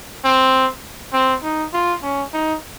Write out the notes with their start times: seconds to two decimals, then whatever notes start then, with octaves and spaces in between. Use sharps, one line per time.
0.25 C4
1.13 C4
1.43 D#4
1.73 F4
2.03 C#4
2.33 D#4